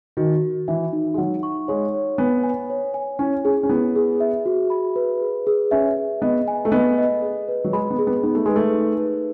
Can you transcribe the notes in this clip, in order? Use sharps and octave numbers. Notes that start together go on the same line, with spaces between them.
D#3 F#4
F#4
E3 E5
D#4
G#3
F#3 F#5
C#6
G#3 C#5
C#5
B3 G#5
G#5
C#5
G#5
C#4 E4
C#4 G#4
C#4
B3 E4
G#4
E5
F#4
B5
B4
G#4
G#4
C#4 E5
G#4
B3 D#5
G#5
A3
B3 D#5
D#5
G#4
B4
F#3
G#3 B5
B3
G#4
B3
B3 D#4
A3
G#3 B4
A3
D#4
B4